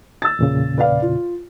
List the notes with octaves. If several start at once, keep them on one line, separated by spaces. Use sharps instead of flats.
E6 A6
E2 A#2 C#3
B4 D5 F5
F4